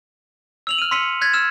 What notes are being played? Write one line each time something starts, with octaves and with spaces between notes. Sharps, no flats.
E6 F7 F#7
F6 D#7
C6 E6 B6 C#7 D#7
F#6 G#6 A6 B6
E6 F6 E7